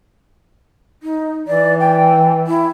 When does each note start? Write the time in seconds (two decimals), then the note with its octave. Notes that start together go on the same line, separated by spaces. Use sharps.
1.03 D#4
1.47 E3 D5
1.79 G5
2.47 E4